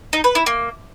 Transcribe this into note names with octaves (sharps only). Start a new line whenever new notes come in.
D#4
B4
E4
A#3